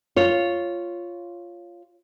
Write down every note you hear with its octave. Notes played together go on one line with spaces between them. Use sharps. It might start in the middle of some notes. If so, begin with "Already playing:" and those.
F4 C#5